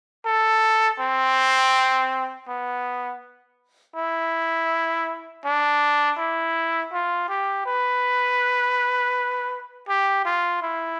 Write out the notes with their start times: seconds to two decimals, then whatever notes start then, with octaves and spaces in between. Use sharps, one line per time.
0.26 A4
1.00 C4
2.48 B3
3.96 E4
5.45 D4
6.18 E4
6.93 F4
7.29 G4
7.66 B4
9.88 G4
10.25 F4
10.62 E4